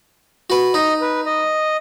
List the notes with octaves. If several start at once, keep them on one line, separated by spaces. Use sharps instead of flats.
F#4 B4
D#4 D#5
B4
D#5